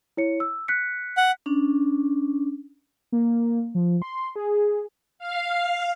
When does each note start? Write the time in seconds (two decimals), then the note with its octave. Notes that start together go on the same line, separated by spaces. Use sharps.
0.17 E4 C#5 C#7
0.40 E6
0.68 F#6 B6 C#7
1.17 F#5
1.46 C#4 D4
3.12 A#3
3.75 F3
4.02 C6
4.36 G#4
5.19 F5